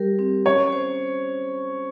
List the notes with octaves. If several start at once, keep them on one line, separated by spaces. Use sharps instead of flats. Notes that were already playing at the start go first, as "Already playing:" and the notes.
Already playing: G3 G4 A#4
C4
C#4 C#5
C5